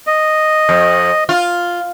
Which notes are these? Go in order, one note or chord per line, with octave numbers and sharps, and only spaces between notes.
D#5
F2
F4